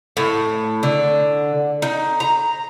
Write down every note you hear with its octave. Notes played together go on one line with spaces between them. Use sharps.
A2
D3
D#4
A#5